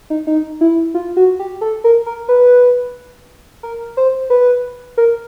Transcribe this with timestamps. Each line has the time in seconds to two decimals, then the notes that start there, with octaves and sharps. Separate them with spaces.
0.10 D#4
0.27 D#4
0.61 E4
0.94 F4
1.17 F#4
1.39 G4
1.61 A4
1.84 A#4
2.06 A#4
2.29 B4
3.63 A#4
3.97 C5
4.30 B4
4.98 A#4